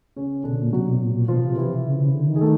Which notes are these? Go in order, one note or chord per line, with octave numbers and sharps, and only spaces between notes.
C#3 C#4
B2 D3 D4
A#2
C3 F#3 F#4
B2
A#2
A#2
B2 F3 F4
C3
E3 E4
C#3
C#3
D3
D#3
G#4
A3 A4